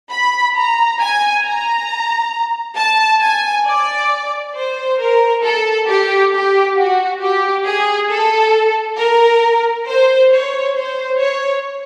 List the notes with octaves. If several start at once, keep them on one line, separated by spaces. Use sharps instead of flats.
B5
A#5
G#5
A#5
A5
G#5
D5
C5
A#4
A4
G4
G4
F#4
G4
G#4
A4
A#4
C5
C#5
C5
C#5